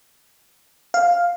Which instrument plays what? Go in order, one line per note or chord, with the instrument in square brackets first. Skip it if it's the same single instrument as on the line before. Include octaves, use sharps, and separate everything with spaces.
[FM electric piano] F5